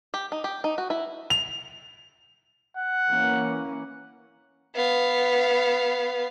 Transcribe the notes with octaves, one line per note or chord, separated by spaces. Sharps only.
G4
D#4
G4
D#4
F#4
E4
F7
F#5
E3 A#3 C#4
B3 F5